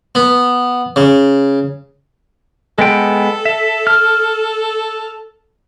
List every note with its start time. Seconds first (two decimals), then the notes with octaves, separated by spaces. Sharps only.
0.15 B3
0.96 C#3
2.79 G#3 B3 A4 G5
3.45 E5
3.87 F6